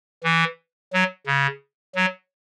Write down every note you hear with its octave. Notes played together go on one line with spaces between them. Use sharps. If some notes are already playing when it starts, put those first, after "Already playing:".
E3
F#3
C#3
F#3